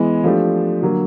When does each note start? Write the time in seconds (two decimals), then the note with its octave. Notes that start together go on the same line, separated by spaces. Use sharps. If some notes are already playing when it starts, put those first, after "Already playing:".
Already playing: E3 G#3 B3
0.24 F3 A3 D4 G4
0.82 D3 F#3 A#3